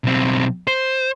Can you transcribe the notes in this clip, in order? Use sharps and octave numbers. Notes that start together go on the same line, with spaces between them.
B1 C4
C5